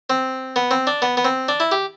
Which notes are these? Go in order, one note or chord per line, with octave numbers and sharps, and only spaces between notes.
C4
B3
C4
D4
B3
B3
C4
D4
E4
G4